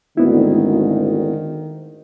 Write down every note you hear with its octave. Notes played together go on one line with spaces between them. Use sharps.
G#1 D2 D#3 B3 E4